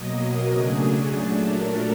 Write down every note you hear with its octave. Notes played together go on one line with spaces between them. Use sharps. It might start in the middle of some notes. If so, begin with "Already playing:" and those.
Already playing: B2 F#3 A#3 D#5
A#4
C#3 F#3 A3 D4 G#4
A#2 F#3 A3 D4 A4
A#4